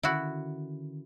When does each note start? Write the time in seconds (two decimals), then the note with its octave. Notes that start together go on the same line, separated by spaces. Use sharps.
0.03 D3 D#3 C#4 E4 F#4